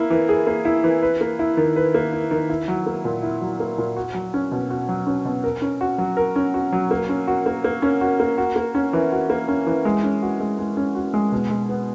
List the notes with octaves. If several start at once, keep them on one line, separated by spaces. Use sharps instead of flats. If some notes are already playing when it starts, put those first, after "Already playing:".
Already playing: A#3 E4
E3
G#4
A#3
E4
E3
B4
A#3
E4
D#3
B4
A#3
E4
D#3
E4
F#3
A#3
A#2
E4
F#3
A#3
A#2
F#4
F#3
C#4
B2
F#4
F#3
C#4
B2
A#4
C#4
F#4
F#3
A#4
C#4
F#4
F#3
A#3
C#4
F#4
A#3
A#3
C#4
F#4
A#3
F#4
A#3
C#4
E3
F#4
A#3
C#4
E3
G#3
C#4
F#4
G#3
G#3
C#4
F#4
G#3
B2
G#3
B3